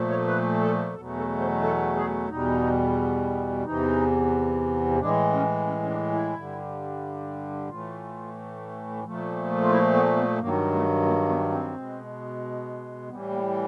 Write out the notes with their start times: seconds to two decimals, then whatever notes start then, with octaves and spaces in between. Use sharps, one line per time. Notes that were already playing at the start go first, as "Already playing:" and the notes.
Already playing: A#2 F3 A3
0.10 C#5
0.27 B4
0.61 A4
0.94 E2 B2 F#3 A3 A4
1.17 A4
1.39 C5
1.62 A4
1.96 G#4
2.29 E2 B2 G3 D#4
3.64 E2 C3 E3 D#4
4.99 A2 E3 G#3 D4
5.33 C#4
5.67 C#4
5.83 C#4
5.89 D4
6.12 E4
6.34 G2 D3 G3
7.69 A2 E3 A3 F4
9.04 A#2 F3 A3
9.62 F4
9.72 E4
9.94 B3
10.16 B3
10.39 G2 D#3 F#3 A#3
10.73 A3
11.06 A#3
11.29 B3
11.52 C4
11.74 B2 G#3
13.09 A2 E3 G3 B3
13.31 A#3